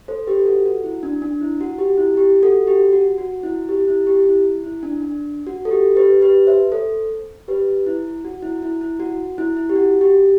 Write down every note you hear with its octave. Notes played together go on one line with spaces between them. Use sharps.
A4 C5
G4 B4
F#4 A4
F#4
E4
D4
D4
E4
F#4
G4
E4
G4
F#4 A4
G4
F#4
F#4
E4
G4
E4
G4
E4
E4
D4
D4
F#4
A4
G4
G4 B4
G4 B4
C5 E5
A4 C5
G4 B4
E4
F#4
E4
E4
E4
F#4
E4
E4
G4
F#4
G4